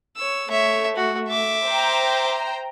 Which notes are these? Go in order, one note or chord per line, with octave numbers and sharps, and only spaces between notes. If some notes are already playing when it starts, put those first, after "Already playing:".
C#5 E6
A3 C#5 E5
F#4
E5 D6
C5 G5 A#5